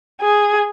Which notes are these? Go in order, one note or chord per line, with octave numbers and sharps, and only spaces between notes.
G#4